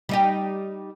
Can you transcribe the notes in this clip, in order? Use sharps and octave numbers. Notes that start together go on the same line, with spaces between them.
G3 D#4 G4